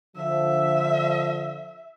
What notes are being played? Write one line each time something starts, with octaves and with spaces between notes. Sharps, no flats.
D3 F3 E5